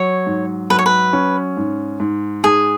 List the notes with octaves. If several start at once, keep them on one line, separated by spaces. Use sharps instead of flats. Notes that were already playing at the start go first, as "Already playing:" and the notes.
Already playing: F#3 C#5
G#2
F#3 B4
C#5
B4
C#4
G#2
G#2
G#2 G#4